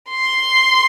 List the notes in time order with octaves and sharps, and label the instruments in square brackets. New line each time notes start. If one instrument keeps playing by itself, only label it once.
[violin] C6